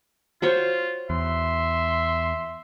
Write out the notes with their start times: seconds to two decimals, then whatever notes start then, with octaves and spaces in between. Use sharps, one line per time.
0.42 F4 F#4 C5 C#5
1.10 E2 E5 C6